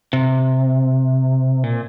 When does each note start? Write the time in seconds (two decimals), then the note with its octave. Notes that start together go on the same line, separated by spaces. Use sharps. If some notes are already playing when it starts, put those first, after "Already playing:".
0.13 C3
1.64 A#2